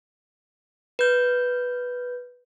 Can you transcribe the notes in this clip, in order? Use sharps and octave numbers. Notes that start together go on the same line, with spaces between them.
B4 G6